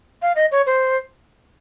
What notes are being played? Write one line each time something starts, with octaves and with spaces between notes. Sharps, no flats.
F5
D#5
C#5
C5